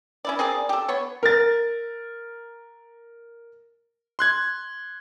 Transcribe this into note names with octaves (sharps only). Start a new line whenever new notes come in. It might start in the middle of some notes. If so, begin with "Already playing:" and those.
C#4 E4 D5
C4 G#4 A#4 D5
G4 A4
B3 C#5
A#4 A6
C6 F#6 G#6